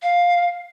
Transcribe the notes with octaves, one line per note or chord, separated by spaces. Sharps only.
F5